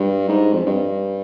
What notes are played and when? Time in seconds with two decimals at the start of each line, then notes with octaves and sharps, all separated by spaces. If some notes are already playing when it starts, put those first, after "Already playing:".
Already playing: G2
0.29 G#2
0.53 F2
0.66 G2